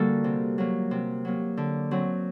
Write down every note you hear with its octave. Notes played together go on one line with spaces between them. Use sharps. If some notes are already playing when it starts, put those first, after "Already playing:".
Already playing: D3 G3 A#3 F#4 A4
C3
F#3 A#3
C3
F#3 A#3
D3
F#3 C4